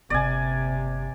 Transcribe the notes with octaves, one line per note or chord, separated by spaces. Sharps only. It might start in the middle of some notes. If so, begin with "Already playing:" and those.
G1 C3 A#3 D5 G#5